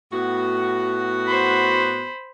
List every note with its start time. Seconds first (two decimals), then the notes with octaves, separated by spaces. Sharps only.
0.13 A2 B3 F#4
1.27 C5 B5